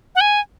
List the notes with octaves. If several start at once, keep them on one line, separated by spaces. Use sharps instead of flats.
F#5
G#5